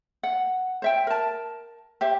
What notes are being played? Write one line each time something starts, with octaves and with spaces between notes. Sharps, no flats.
F#5
C5 E5 G5
A#4 A5
G4 C5 E5